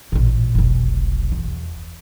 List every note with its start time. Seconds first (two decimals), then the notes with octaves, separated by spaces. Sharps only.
0.12 A1 A#2
0.55 F1 B1
1.32 E2